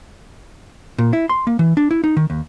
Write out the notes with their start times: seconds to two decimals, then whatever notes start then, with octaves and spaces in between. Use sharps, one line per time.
0.98 A#2
1.13 E4
1.29 C6
1.47 A#3
1.59 E3
1.77 D4
1.91 E4
2.04 D#4
2.17 D#3
2.30 D#2